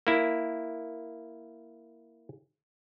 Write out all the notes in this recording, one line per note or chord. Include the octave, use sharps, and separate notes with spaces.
A#3 E4